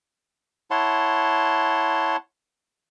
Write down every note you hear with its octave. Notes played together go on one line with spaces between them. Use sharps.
E4 C#5 F#5 A5 C6